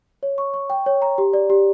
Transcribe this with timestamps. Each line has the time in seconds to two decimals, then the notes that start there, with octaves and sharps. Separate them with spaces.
0.23 C#5
0.38 C#6
0.54 C#6
0.70 G5
0.86 C#5
1.02 A#5
1.18 G4
1.33 D5
1.50 G4